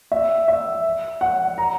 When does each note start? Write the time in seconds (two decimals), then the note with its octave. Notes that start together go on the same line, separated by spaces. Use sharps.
0.12 E5
0.48 E5
1.21 F#5
1.58 A#5